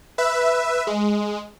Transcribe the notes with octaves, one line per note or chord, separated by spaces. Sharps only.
B4 E5
G#3